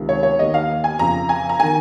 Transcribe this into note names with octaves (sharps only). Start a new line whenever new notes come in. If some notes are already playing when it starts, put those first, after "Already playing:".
Already playing: C#2 C3 D#3
C#5
C#5
D#2 D#3 D#5
F5
G#5
F2 C#3 A#5
G#5
A#5
D#3 G#5